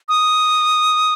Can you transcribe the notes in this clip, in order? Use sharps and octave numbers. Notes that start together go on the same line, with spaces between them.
D#6